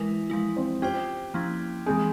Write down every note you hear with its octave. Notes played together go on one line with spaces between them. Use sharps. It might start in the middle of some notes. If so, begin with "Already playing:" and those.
Already playing: E3 G#3 E4 A#4
F3 G#3 E4
C4
C#4 F4 G4 C5
F3 A#3 C#4 E4
E3 G#3 C4 G4 G#4